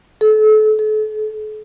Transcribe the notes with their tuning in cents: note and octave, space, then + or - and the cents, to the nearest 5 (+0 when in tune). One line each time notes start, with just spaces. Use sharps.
A4 -35
A4 -40